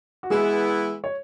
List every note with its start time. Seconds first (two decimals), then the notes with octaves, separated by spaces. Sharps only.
0.23 F#4
0.30 E3 G#3 B3 E4 G#4
1.04 C#5